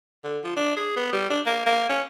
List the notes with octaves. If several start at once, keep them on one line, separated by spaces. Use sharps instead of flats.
D3
F3
D4
G#4
B3
G3
D4
A#3
A#3
C#4